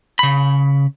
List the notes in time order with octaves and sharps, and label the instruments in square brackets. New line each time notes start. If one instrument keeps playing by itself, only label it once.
[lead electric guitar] C#3 B5